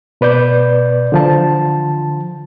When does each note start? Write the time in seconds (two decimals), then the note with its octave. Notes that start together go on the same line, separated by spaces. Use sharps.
0.21 B2 B4 D5 G6
1.12 D3 F3 A5